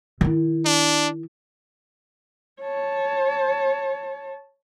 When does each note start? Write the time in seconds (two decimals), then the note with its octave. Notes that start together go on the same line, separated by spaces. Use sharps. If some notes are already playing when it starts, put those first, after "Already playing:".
0.21 D#3 E4
0.65 D4
2.62 C#5 A5